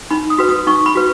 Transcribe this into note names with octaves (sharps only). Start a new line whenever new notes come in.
D#4 B5
D#6
F#4 B4
D#6
D#4 C#6
B5
F#4 B4